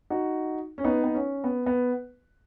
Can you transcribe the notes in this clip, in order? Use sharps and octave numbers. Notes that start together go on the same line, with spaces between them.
D#4 F#4
C#4
B3 D#4
B3
C#4
B3
B3